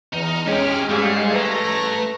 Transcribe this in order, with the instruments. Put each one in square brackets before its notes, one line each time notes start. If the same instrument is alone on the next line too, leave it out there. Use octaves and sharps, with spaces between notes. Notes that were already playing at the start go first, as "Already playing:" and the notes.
[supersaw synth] E2 A#5 F6 [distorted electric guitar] D#4
[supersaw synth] G#3 F6 [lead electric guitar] C#4 [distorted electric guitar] G4 G#4
[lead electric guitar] G#2 [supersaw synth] G3 G#4 F5 [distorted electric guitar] A3
[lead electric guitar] B4 A5 [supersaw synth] A#5 A#6